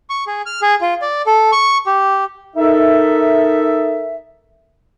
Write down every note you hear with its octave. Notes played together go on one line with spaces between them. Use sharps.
C#6
G#4
F6
G#4
F4
D5
A4
C#6
G4
D#4 A4 A#4 E5